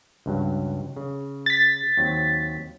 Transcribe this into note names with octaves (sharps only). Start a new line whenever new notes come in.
C#2 G2 F#3
C#3
A6 B6
D#2 F#3 C4